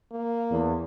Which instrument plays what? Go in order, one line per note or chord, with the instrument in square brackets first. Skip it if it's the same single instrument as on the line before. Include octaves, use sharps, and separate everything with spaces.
[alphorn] A#3
[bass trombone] E2